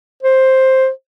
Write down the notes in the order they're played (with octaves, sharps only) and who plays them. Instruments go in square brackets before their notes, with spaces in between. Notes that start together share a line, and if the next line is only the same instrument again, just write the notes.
[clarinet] C5